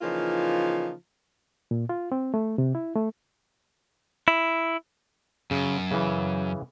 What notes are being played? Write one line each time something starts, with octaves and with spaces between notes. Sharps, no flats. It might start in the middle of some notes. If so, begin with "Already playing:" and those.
C#3 E3 F3 A#3 D#4 F4
A#2
F4
C4
A3
C3
E4
A3
E4
F#2 C#3
C#3 E3